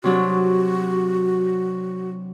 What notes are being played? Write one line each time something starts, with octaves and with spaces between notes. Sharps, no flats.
C3 F#3 D4 F#4